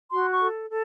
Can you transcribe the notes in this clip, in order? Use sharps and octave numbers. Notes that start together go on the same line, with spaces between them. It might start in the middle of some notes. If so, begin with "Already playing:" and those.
F#4 C6
C#6
A4
A4